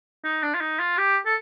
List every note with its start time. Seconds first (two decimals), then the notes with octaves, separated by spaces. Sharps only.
0.24 D#4
0.43 D4
0.54 F4
0.60 D#4
0.79 F4
0.98 G4
1.26 A4